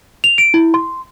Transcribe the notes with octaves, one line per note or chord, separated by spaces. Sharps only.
F7
D7
E4
C6